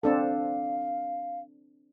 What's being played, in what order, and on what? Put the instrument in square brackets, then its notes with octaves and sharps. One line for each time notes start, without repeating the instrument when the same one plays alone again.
[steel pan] C4 D4 A4 [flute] F5